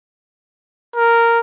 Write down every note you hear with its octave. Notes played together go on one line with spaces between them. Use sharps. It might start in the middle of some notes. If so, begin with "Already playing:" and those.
A#4